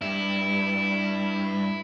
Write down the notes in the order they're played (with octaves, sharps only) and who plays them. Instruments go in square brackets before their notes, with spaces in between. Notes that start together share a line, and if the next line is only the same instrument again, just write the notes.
[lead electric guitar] G2 [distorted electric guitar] E4